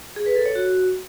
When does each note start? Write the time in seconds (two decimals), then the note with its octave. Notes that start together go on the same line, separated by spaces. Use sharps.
0.16 G#4
0.26 B4
0.36 A4
0.46 C#5
0.55 F#4